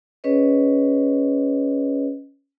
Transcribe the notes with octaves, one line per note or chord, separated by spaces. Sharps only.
C#4 G#4 B4 C#5 D#5